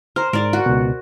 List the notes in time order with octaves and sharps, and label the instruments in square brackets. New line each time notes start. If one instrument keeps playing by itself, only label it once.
[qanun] C5 [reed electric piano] A#5 F6
[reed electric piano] G#2 [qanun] A#4 D5
[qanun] F#4
[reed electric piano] C#2 B2